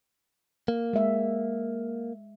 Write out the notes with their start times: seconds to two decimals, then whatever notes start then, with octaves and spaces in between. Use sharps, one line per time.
0.68 A#3
0.93 G#3 E5